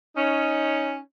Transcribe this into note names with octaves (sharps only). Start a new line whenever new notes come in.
C#4 D#4